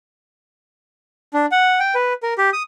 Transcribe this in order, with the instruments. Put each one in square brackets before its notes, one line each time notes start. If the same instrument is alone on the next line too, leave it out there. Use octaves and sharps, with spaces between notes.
[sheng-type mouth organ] D4
F#5
G5
B4
A#4
G4
D#6